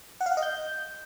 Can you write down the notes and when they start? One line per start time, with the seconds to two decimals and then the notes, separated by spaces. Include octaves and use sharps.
0.21 F#5
0.26 F5
0.32 F#5
0.37 D#5
0.43 G6